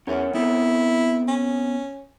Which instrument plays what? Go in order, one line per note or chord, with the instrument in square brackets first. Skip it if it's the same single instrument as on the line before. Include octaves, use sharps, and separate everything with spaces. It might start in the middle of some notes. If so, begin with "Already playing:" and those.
[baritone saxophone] E2 [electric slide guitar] C#4 A#4 F#5
[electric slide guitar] B3 C4 A4 [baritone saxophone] E4
[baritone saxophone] C#4